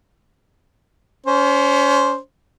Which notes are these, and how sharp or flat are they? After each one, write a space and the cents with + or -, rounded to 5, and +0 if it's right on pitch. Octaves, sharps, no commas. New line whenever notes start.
C#4 +30 C5 +0